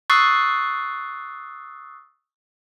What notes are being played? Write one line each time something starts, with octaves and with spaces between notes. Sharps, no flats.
C#6 D#6 E6 F#6 A6 C7